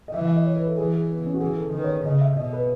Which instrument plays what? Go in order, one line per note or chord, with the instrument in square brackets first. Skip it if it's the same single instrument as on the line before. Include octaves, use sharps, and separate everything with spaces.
[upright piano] D#5
[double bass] E3 [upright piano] E5
[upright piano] E5
D#5
C#5
B4
A4
[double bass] E3 [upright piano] G#4
[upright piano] G#4
B3
C#4
F#4
[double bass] E3 [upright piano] G#4
[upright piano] A4
[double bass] D#3 [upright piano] B4
[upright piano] C#5
[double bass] C#3 [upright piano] D#5
[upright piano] E5
[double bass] B2 [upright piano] D#5
[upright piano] B4